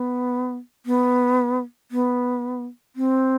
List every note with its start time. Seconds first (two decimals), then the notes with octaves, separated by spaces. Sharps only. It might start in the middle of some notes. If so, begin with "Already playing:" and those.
Already playing: B3
0.86 B3
1.91 B3
2.96 C4